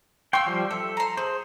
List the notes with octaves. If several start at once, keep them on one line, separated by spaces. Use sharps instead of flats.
F5 G5 C6 C#6 E6
F3 G3 C5
A4 E5
A#5 C6
G#4 C5